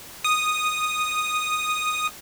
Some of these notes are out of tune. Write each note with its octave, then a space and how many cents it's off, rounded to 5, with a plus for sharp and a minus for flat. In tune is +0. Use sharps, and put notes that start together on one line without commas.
D#6 -5